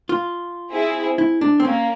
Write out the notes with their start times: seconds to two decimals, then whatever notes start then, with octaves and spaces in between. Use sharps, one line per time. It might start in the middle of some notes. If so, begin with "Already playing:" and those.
0.09 F4
0.71 C4 E4 G#4
1.18 E4
1.41 D4
1.60 C4
1.65 A#3 C#4